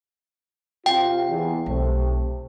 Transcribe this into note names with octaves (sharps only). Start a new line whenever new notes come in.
C3 F4 G5
E2
B1 C3 A3